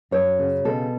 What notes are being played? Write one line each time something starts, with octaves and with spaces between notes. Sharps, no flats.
F#2 C#5
C#3
B2 A4